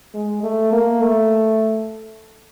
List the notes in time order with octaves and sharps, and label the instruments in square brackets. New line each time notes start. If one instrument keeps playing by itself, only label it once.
[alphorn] G#3
A3
A#3
A3